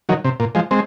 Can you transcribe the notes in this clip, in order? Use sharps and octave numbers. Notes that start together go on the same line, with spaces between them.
D#3 F#3
C3
A#2
F3 G#3
G#3 C4